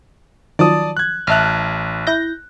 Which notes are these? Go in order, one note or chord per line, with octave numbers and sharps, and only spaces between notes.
D#3 F3 F#3 D5 A5 D#6
F#6 G#6
A1 E5 A5 F6 F#6
E4 G6 A#6